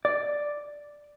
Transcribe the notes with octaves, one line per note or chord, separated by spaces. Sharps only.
D5